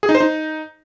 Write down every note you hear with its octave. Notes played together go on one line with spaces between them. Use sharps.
G#4
D#4
C5
D#4